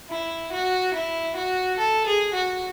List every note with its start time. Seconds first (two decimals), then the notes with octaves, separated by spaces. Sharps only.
0.10 E4
0.52 F#4
0.94 E4
1.36 F#4
1.78 A4
2.06 G#4
2.34 F#4